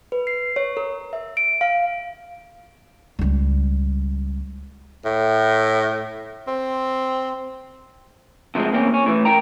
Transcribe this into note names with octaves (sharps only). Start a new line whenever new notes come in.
B4
C7
C#5
A#4
E5
D7
F5
C#2 G3
A2
C4
C3 F3 F#3 G#3 C4
E2 A#3 C4 C#4
C#4
A2 E3
A#4 G5 A#5